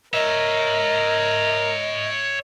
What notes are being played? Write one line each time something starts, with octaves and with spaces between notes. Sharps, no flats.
A#4 C#5 D#5 E5